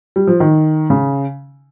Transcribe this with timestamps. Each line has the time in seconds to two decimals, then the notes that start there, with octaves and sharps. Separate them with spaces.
0.16 G3
0.27 F3
0.40 D#3
0.90 C#3